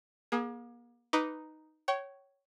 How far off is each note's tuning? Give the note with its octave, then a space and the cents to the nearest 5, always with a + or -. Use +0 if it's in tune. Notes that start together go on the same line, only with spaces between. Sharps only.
A#3 +40 G#4 +0
D#4 +0 B4 +5 D6 -10
C#5 +0 G5 -35